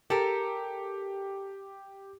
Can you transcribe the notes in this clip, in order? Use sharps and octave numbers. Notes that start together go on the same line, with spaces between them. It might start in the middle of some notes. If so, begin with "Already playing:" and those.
G4 A4 A#4